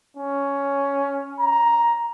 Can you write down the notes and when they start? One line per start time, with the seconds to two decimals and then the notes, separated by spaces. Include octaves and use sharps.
0.17 C#4
1.40 A#5